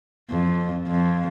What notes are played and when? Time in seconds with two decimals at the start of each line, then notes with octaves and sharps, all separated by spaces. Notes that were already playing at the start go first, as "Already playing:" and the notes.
0.30 F2
0.87 F2